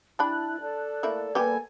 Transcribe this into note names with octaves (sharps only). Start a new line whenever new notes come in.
G3 D4 E4 A5 B5 F#6
A4 D5
A3 A#3 E4
G3 A#3 B3 G4 A4 B4 G#5